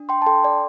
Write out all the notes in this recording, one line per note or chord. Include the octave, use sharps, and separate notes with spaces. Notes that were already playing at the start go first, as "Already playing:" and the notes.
Already playing: D4
G5 C6
A5
A4 G5 C6
D5